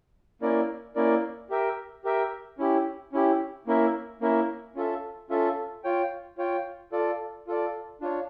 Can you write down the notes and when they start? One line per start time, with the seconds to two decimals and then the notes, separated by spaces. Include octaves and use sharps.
0.41 A#3 C#4 E4 A#4 D5
0.96 A#3 C#4 E4 A#4 D5
1.50 G4 A#4 E5 G5
2.04 G4 A#4 E5 G5
2.58 C#4 E4 G4
3.12 C#4 E4 G4
3.67 A#3 C#4 E4 A#4 E5
4.21 A#3 C#4 E4 A#4 E5
4.75 C#4 F4 A4 E5
5.30 C#4 F4 A4 E5
5.84 F4 C#5 G5
6.38 F4 C#5 G5
6.92 F4 A4 D5
7.47 F4 A4 D5
8.01 D4 F4 C#5